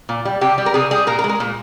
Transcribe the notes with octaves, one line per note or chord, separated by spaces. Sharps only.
A#2
G3
C3 G4
G3
A#4
C3 G#4
G3 G#4
A#2 A#4
A#4
G#3
A#4
A#2